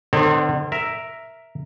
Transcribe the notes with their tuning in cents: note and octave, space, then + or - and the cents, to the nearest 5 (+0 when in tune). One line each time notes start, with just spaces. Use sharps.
D3 +45 C4 -30 C5 +45
A#4 +0 E5 +0